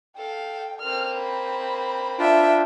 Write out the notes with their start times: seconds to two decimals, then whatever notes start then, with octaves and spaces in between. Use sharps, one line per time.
0.17 A4 F5 G5
0.82 A#3 C4 F6
1.18 B5
2.19 D4 F4 E5 G5